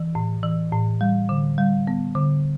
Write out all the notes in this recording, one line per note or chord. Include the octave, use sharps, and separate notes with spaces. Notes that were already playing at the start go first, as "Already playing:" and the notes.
Already playing: E3
A2
E3
A2
G3
D3
G3
B3
D3